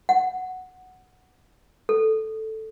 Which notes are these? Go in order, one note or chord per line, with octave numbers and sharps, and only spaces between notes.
F#5
A4